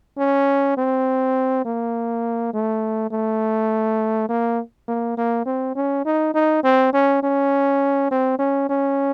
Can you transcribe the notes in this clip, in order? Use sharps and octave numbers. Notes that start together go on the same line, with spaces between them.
C#4
C4
A#3
A3
A3
A#3
A#3
A#3
C4
C#4
D#4
D#4
C4
C#4
C#4
C4
C#4
C#4